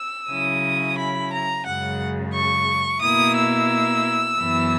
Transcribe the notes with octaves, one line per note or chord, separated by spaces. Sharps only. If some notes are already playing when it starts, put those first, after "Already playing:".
Already playing: E6
C#3 F#3 C#4 E4 D#6
B5
A#5
F#2 C#3 G#3 F#5
C#6
B2 A#3 E4 D#6
E6
F#2 E3 B3 E4